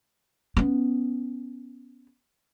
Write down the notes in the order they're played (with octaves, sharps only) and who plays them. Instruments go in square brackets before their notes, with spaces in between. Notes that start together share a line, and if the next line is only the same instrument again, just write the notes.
[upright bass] B3 C#4